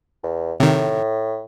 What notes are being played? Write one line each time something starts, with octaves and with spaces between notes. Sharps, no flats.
E2
A2 C3 D#3